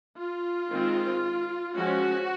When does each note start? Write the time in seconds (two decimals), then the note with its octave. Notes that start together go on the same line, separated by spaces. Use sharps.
0.17 F4
0.69 D#3 G#3 C4
1.75 F3 G#3 C#4 F#4